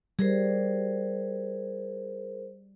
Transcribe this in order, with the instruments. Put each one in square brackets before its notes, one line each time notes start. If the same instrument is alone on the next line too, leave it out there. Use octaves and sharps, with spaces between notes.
[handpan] G3 [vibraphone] G#4 A#4 C5